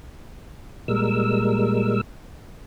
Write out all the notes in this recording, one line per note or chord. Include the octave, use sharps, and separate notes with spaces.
A#2 G3 G#3 A#4 E6